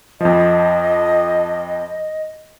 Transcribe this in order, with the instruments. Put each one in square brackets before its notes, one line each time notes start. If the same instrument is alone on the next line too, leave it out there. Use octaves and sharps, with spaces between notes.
[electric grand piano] F2 F3 [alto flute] D#5